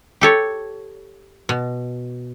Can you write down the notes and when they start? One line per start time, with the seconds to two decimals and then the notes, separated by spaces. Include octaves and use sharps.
0.21 G4 A4 C#5
1.49 B2